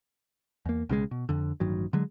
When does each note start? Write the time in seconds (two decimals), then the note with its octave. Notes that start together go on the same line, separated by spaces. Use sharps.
0.66 E2 A#3
0.89 B1 C#3 F3 G#3
1.11 B2
1.29 F2 D3
1.60 A1 G2 D#3 F#3
1.93 D3 F#3 G#3